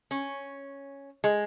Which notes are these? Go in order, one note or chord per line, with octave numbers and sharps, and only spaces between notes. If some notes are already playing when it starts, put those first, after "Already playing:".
C#4
G#3